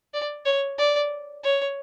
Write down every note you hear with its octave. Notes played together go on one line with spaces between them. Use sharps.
D5
C#5
D5
C#5